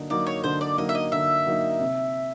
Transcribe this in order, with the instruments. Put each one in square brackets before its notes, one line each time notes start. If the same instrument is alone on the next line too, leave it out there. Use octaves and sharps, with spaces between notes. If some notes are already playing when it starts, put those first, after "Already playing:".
Already playing: [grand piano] D3 F#3 A#3 D#4
[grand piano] F#3 A#3 D#4 [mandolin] D5
[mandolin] C#5
[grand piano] D3 [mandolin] C5
[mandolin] D5
[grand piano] F#3 A#3 D#4 [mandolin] D#5
[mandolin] E5
D#5
[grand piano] D3 [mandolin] E5
[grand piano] F#3 A#3 D#4
C3